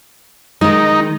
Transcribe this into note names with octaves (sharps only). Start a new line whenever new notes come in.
D#3 G#3 D#4